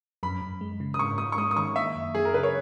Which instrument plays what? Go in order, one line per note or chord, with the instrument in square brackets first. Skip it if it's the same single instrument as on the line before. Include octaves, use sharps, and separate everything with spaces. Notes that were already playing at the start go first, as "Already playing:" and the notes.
[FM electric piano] F#2 [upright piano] B5
[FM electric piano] F#2
G#3
C#3
[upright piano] D#6
[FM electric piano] G#2 [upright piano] C#6
[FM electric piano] G#2 [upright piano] D#6
[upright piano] C#6
[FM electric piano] G#3 [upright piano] D#6
[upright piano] D#6
[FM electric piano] D#3 [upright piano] C#6
[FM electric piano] A#3 [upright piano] E5
[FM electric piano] F#2
[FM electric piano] F#3 [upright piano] G#4
[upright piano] A#4
[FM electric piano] C#3 [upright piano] B4
[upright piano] C#5